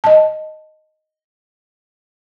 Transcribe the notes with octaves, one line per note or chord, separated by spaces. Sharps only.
D#5 A5